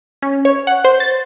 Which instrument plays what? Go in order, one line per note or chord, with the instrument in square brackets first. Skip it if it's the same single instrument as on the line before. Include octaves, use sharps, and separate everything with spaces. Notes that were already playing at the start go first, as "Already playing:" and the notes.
[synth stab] C#4
C#5
F#5
C5
A6